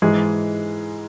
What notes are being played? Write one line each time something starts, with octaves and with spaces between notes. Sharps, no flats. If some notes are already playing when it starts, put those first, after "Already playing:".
G#2 E3 G#3 G#4